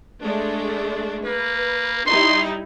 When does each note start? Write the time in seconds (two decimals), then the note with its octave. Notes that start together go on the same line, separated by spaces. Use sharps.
0.21 G#3 A3 D4
1.26 A#3 B4
2.06 G3 D#4 E4 C6